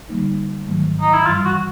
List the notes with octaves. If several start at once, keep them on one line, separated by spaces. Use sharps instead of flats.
D3 G3 A#3 D#4
G#2 D#3 F#3 A3
D#4
E4
G2 E3 G3 F4
F#4